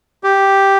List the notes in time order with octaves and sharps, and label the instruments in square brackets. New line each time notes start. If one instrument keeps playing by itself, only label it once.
[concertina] G4